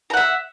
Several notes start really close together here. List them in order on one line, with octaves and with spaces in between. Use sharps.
A#5 F#5 E5